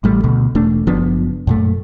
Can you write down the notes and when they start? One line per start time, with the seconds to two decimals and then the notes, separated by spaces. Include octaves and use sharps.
0.04 A1 G3 A3
0.24 D2 B2
0.55 E1 A3 D4
0.87 F#1 F3 B3 D4
1.47 F#2 A#2 A3